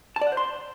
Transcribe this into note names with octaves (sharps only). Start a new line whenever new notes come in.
A5
D5
F#5
C5
C6